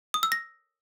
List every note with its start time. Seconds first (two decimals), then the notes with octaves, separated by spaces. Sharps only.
0.14 D#6
0.23 E6
0.32 A#6